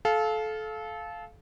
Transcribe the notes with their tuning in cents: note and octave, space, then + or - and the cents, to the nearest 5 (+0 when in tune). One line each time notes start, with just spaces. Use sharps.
A4 -25 F5 +0